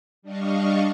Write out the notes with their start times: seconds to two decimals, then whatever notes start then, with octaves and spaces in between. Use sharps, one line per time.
0.22 G3 D4 D#5 F5 C#6